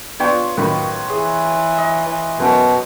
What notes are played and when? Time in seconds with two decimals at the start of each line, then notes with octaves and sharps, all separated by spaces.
0.20 B3 D4 F4 C#5 G5
0.57 F#2 A2 D#3 B4
1.10 E3 G#4
1.78 D#5
2.40 F#2 B2